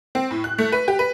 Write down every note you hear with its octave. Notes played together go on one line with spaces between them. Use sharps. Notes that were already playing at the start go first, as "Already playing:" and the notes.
C4
A2
F#6
A3
B4
G4
B4